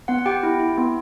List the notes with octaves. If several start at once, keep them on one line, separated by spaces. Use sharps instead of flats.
B3 F#5
F#5
G4 G5
E4
E4
B3